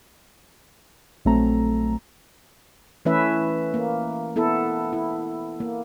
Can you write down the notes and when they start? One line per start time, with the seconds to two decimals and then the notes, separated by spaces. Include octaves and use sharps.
1.25 A#1 F#3 A3 C4 A4 A#5
3.05 E3 A3 C#4 E4 B4 E5
3.74 A#3
4.36 B3 E4 A4
4.93 E4
5.60 A#3